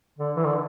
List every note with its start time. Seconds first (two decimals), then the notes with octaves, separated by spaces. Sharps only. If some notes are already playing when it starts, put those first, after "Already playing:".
0.18 D3
0.36 E3
0.46 D3